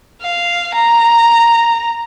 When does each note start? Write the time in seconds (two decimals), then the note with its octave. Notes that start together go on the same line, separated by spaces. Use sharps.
0.22 F5
0.75 A#5